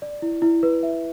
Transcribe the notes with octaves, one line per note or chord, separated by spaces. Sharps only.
D5
E4
E4
B4
E5